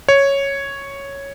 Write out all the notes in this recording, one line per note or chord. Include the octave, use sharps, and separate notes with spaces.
C#5